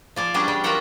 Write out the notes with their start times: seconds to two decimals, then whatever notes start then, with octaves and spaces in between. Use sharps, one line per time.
0.16 F3 D5 G#5
0.34 G3 B3 C#4 D4 G#4
0.48 G3
0.64 F4 F#4 A#4 E5 F#5 G5